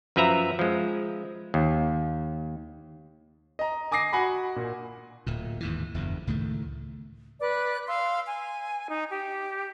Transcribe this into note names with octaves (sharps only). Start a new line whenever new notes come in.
F#2 F3 B4 E5 A#5
F3 G#3
D#2
D#5 A#5
G#5 D6 D#6 A#6 C7
F#4 F#5 G#5 B5
A#2
D1 A#2
D#2 G#2 E3
F#1 E2 G2
C#2 A2 D#3 A3
B4 D5 F#6
F5 C6 E6
G#5
D#4
G4